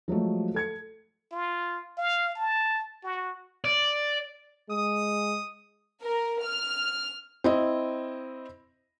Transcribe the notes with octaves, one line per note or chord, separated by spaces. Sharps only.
F3 F#3 G#3 A3
A4 G#6 C#7
F4
F5
A5
F#4
D5
G#3 D#6
A#4
F6
C4 E4 D#5